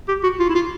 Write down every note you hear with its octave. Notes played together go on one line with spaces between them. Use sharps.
G4
F#4
F4
E4
F4